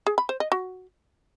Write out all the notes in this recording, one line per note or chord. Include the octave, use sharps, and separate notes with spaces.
G#4
B5
C5
D#5
F#4